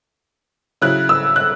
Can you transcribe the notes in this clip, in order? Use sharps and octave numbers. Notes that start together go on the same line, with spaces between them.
C#3 F#3 E4 F#6
E6
F#6